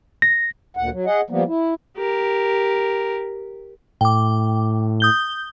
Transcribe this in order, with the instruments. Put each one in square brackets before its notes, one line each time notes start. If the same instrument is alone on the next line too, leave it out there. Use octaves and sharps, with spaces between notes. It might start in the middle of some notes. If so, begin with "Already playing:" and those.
[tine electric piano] A#6
[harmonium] D2 A#2 F#5
F#3
G#4 D#5 F#5
F3 G3 A#3 B3
E4
[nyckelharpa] G4 A#4
[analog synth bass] A2 [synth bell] G5 D6
[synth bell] D#6 G6 G7